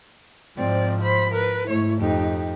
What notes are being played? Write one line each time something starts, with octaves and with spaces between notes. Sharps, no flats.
G#2 F3 C4 D5
C5 B5
A#4 B4
G#2 A3 E4 C#5
F2 D#4 G4